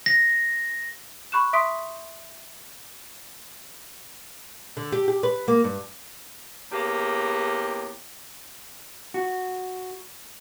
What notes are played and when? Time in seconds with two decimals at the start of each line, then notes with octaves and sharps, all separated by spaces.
0.06 A#6
1.32 B5 C#6 F#6 E7
1.53 E5 C6 D#6 B6 D7
4.77 D3
4.92 G4
5.08 G4
5.23 B4
5.48 A#3
5.64 G2
6.71 E2 C#3 A#3 G4
9.14 F#4